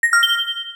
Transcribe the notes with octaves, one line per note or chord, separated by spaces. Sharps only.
A#6
F6
G7